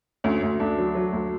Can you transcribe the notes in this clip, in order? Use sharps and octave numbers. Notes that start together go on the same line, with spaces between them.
D2 C#4
D2
D2 D4
F#3
F#3
D2